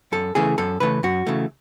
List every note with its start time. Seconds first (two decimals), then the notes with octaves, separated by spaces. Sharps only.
0.12 F#2 A4
0.35 C#3 E3 A3 G#4
0.58 F#2 A4
0.80 C#3 E3 A3 B4
1.03 F#2 F#4
1.27 C#3 E3 A3